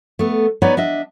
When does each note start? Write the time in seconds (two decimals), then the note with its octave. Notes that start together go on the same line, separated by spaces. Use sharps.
0.19 A3 B3
0.62 B3 D#4 B4 C#5 D5
0.77 D4 D#5 E5